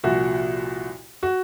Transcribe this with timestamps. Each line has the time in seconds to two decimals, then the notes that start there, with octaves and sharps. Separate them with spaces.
0.04 C2 A#2 F3 F#4
1.23 F#4